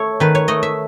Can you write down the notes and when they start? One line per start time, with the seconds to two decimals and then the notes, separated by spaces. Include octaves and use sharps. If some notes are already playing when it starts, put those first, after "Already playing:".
Already playing: A3 A4 C#5
0.20 D#3 B4
0.35 C#5
0.48 A3 D#5
0.63 E5